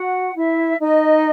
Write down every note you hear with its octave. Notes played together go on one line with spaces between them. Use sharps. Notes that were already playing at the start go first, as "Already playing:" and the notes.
Already playing: F#4 F#5
E4 E5
D#4 D#5